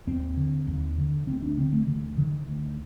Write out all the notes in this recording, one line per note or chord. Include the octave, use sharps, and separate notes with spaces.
D#2 C4
D3
D#2
D3
D2 C4
D4
D3 C4
A3
D2 D#3
D3 D#3
D2